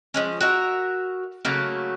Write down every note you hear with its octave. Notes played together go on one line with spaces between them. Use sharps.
F3 G#3 C#4
F#4 A#4 E5
C#3 F#3 A3 A#3